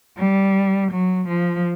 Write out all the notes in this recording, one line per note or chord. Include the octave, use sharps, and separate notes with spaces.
G3
F#3
F3